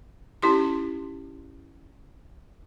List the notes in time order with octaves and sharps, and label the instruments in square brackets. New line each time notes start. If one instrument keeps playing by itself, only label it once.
[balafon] C#4 D#4 E4 G4 C6